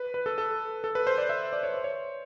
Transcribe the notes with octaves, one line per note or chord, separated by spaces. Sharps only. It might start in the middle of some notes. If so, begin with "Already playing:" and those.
Already playing: B4
B4
A4
A4
A4
B4
C5
D5
E5
D5
C#5
C5
C#5